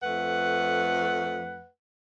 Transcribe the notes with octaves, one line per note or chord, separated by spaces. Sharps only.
F2 A3 B4 F#5